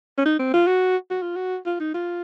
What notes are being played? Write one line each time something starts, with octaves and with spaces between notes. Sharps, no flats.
C#4
D#4
C4
F4
F#4
F#4
F4
F#4
F4
D#4
F4